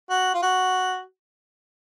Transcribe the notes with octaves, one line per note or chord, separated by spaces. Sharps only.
F#4
F4
F#4